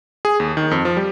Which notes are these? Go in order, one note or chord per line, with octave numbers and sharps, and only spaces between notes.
G#4
D#2
D#3
F2
F3
G3